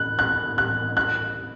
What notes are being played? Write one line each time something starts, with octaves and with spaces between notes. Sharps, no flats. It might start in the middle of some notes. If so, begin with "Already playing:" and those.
Already playing: F#6
F#6
F#6
F#6